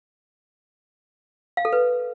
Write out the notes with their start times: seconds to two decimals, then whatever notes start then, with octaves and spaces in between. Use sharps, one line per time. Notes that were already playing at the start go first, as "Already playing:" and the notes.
1.57 F5
1.65 A4
1.73 B4